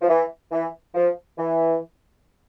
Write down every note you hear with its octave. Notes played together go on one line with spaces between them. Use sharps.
F3
E3
E3
F3
E3